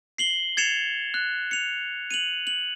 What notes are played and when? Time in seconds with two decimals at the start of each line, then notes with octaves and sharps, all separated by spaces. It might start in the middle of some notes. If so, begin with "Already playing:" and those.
0.18 C7 F#7 G7
0.57 G#6 A6 C7 C#7 E7 F7
1.14 F#6
1.51 C#7 F7
2.11 D#7 F7 F#7
2.47 F#7